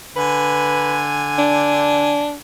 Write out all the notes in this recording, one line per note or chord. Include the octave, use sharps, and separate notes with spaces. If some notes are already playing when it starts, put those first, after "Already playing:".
D3 B4 G#5
D4